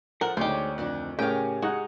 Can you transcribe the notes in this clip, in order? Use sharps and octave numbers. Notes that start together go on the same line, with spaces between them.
F3 A4 A#4 F#5 F#6
D2 G#3 D#4 G4 C5 C#5 D6
F2 D#3 D4 F#6
A2 C#3 C#4 G4 A#4 F5 G5 G#5
G#3 D#4 F#4 F#5